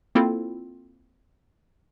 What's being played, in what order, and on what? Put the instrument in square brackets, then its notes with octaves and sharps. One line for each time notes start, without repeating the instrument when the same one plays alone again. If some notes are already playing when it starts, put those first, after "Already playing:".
[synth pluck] A#3 C4 E4 F4 A4